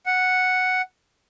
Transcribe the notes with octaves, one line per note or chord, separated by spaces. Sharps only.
F#5